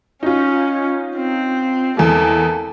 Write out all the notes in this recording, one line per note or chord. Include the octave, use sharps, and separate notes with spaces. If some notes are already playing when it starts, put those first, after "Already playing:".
C#4 D#4 F4
C4
E2 G#3 A#3 A4